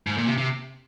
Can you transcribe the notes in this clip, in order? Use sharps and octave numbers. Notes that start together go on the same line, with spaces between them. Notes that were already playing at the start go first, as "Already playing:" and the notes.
G#2
A#2
C3
C3